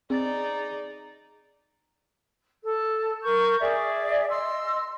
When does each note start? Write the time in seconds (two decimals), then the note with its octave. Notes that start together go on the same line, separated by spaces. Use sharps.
0.10 C4 D#4 G#4 D5 A6
2.63 A4
3.22 A#4 C#6 G6
3.60 G#4 D5 E5
4.29 D#5 C6 E6